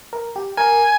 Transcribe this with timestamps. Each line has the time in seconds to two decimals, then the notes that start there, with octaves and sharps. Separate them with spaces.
0.13 A#4
0.36 G4
0.57 A#4 G#5